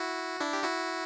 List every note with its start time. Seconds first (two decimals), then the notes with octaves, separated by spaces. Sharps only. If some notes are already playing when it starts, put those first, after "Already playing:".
Already playing: E4 F#4
0.40 D4 E4
0.53 G4
0.63 E4 F#4